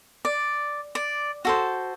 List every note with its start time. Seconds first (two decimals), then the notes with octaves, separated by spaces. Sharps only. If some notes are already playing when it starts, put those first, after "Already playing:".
0.25 D5
0.95 D5
1.45 F#4 A4 C5